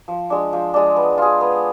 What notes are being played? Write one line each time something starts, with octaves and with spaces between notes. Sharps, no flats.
F3
G#3 D4
F3
G#3 D4
B3
F4 G#4
B3